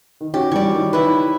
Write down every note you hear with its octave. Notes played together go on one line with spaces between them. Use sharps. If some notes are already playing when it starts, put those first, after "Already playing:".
D#3
C#4 F#4 G4
E3 G3 C#5 D5
D#3
E4 B4